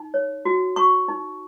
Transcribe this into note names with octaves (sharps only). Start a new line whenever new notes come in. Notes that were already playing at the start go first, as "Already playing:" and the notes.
Already playing: D#4
C#5
F#4
F#4 C#6
D#4